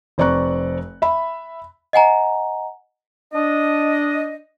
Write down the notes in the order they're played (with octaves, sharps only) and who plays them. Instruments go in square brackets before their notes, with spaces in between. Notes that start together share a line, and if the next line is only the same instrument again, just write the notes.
[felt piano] F1 C4 D5 A#5 C#6 F#6
E5 B5
[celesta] D#5 F#5 G#5 A#5
[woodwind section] D4 D#5